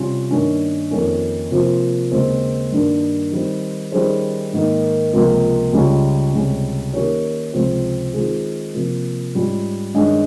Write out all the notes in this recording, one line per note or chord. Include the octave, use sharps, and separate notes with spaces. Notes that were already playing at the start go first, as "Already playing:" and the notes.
Already playing: C3 G3 C#4 F4
G2 D#3 A#3 C#4
F2 D#3 A#3 C#4
C3 F3 A#3 F4 C5
D#2 C#3 G#3 C4
G2 D#3 G3 A#3
D#3 G3 C4
D#3 G3 C#4 G#4 C5
G#2 D#3 A#3
C#2 C3 F3 A#3 F4
C#2 C#3 G3 C#4 F4
C#2 C3 G3 C#4
D#3 A#3 C#4 G4 C#5
C#2 C3 F3 C4
D#3 G#3 C4 F4 G#4
C3 F3 A#3
G#2 G3 C#4 F4
G2 D#3 G#3 C#4